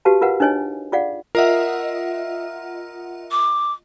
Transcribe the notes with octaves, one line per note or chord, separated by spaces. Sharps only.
F#4 G4 B4 F5 A5
F4 A#4 B4 F5 F#5
D4 D#4 B4 C#5 D#5 G#5
F4 G#4 D5 F5 F#5
F4 A#4 D#5 E5 F#5
D6